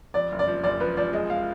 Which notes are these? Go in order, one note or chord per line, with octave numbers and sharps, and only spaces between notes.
F2 D5
F#1
D5
F3
F#1 D5
F3 B4
F3 D5
G#3 D#5
F5